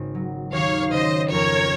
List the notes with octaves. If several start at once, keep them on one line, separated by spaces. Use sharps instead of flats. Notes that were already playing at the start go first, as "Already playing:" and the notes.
Already playing: G#1 C#3 C#4
F#3
D#2 C#5 F5
C#3 C5 D#5
F2 A#4 C#5